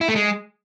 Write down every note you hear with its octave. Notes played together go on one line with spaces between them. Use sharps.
E4
A3
G#3